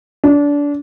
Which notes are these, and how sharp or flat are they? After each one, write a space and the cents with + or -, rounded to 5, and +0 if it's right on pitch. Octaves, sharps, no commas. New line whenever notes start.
D4 -25